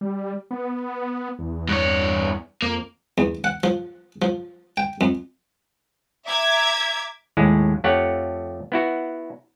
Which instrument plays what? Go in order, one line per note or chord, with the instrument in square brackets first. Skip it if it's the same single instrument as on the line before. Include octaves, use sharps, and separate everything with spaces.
[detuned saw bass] G3
B3
E2
[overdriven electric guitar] G2 C#5
[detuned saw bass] F2 [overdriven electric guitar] A#3
[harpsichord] E2
F#5
F3
F3
G5
F2
[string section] E5 A#5 D6 G#6
[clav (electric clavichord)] D#2 A2 G#3
F2 A3 G4 C#5 F#5
B3 E4 F#4